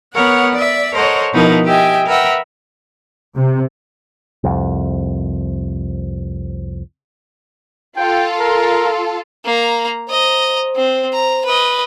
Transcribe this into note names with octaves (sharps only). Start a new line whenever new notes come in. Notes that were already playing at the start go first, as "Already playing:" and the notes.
B3 A#4 C#5 F#5
D5 E5
A4 A#4 C5 C#5 D#5 F#5
B2 F3 B3 D#4 E4 A#4
G4 D#5 E5 G5 G#5
A#4 B4 E5 F#5 G5
C3
C2 F2
F4 A4 G5
A#4
A#3 A#5
C5 D#5 A#5
C4
A#5
B4 D#5